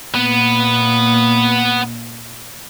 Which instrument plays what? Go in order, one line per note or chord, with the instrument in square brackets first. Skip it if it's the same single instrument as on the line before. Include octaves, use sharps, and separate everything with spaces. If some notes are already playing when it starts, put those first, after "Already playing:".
[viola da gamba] A#2 A#3 [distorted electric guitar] B3